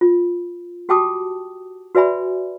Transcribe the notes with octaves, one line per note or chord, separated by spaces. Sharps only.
F4
F#4 G4 G5 A5 D6 D#6
F#4 B4 D5 E5 G#5 B5